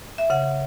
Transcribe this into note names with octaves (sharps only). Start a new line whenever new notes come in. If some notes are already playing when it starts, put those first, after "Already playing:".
E5
C#3 F#5